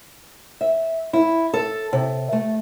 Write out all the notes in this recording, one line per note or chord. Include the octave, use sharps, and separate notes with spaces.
E5
E4
A4
C3
A3